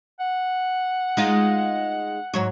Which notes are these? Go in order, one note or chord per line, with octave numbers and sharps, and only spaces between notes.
F#5
G#3 D#4 F4
G#2 F#3 C#5